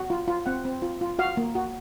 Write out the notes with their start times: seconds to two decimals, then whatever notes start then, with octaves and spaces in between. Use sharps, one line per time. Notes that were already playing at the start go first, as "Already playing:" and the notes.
Already playing: F#4
0.10 F4
0.28 F4
0.46 C4 F#5
0.65 C4
0.82 F4
1.01 F4
1.19 F#4 F5
1.37 A#3
1.55 F#4